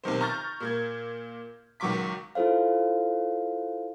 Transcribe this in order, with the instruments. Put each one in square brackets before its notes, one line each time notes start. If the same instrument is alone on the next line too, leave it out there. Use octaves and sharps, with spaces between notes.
[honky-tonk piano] B1 C3 D#3 C5
A#5 C#6 F6 G6 A6
A#2 A#3 G#6
C#2 D#3 F#3 C#6 D6 B6
[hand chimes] E4 F4 A4 C5 F5